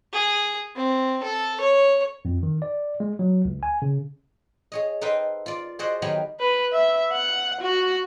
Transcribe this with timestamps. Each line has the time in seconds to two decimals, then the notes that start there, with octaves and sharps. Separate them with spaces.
0.13 G#4
0.76 C4
1.23 A4
1.61 C#5
2.25 F2
2.43 D#3
2.62 D5
3.00 G#3
3.19 F#3
3.45 C#2
3.63 G#5
3.82 C#3
4.72 G#4 C#5 D#5
5.01 D#4 A4 B4 C5 F5 G5
5.46 F4 D5
5.79 F#4 G#4 C5 D5 D#5 F#5
6.02 D#3 F#3 B3 G4 F5 G#5
6.40 B4
6.73 E5
7.12 F#5
7.62 F#4